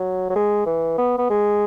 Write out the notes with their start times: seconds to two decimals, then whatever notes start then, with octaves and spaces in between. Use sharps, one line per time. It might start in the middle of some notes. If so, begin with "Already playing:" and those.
Already playing: F#3
0.30 F#3
0.36 G#3
0.66 E3
0.98 B3
1.18 B3
1.30 G#3